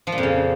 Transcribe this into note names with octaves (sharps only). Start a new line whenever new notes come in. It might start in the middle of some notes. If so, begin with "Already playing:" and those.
F3
A#2
F2
C#3